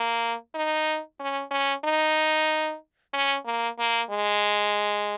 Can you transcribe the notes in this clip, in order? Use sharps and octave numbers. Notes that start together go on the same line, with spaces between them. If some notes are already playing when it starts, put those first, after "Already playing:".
Already playing: A#3
D#4
C#4
C#4
D#4
C#4
A#3
A#3
G#3